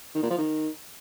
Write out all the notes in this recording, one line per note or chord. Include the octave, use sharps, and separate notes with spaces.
D#3
A#2
F3
D#3